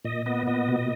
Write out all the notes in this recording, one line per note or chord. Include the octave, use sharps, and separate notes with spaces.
A#2 D#5
B3 D#5
A#2 D#5
B2